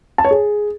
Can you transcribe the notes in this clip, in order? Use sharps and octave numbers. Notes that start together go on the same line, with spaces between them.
A5
C#5
G#4